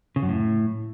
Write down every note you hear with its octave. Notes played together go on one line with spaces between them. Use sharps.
C#3
F#2
A2